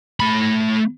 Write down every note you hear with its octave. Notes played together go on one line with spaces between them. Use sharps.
A3 B5